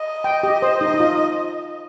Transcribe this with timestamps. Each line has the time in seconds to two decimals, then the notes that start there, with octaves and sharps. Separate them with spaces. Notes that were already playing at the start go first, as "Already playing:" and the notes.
Already playing: D#5
0.24 G5
0.43 G4
0.62 C5
0.81 D#4
0.94 D#4
1.00 F4